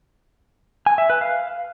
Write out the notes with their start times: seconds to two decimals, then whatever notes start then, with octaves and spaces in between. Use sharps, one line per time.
0.86 G#5
0.98 E5
1.10 B4
1.21 F5